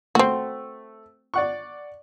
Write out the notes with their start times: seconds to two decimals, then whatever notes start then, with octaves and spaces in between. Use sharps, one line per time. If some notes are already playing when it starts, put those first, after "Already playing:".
0.15 A3 C4 F#4
1.34 D5 F#5 C#6